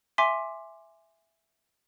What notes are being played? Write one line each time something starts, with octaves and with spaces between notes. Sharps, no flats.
E5 G#5 C6 D6 B6